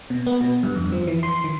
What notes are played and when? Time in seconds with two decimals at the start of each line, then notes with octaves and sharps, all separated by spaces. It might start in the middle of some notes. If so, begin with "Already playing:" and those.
0.10 B2
0.27 B3
0.41 B2
0.63 G2
0.75 F2
0.92 F3
1.07 E3
1.23 C6
1.44 D#3